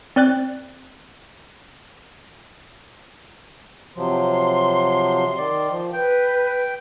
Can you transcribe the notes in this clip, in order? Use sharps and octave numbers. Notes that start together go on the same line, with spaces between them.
C4 D5 F#6 A6
C3 F3 F#3 C6
D#3 D5
F3
B4 G5